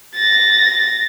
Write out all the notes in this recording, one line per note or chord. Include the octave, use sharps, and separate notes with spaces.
A6 A#6